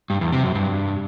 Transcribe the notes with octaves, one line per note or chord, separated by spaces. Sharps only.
G2
E2
C3
F#2
G2